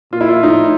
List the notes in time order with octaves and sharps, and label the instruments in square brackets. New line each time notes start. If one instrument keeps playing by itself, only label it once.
[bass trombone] A#2 [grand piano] F4
[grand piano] E4
F4
[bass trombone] A2 [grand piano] D#4